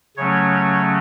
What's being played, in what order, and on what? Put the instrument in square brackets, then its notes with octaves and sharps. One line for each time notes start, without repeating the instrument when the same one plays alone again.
[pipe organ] C#3 F#3 A3 C#4 C#5